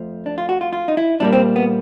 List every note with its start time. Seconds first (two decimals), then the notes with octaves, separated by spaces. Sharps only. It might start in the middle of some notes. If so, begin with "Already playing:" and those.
Already playing: F2 F3 A3
0.26 D4
0.38 F4
0.49 F#4
0.61 F4
0.73 F4
0.88 D#4
0.97 E4
1.20 A#2 G3 A#3 D4
1.33 C4
1.56 B3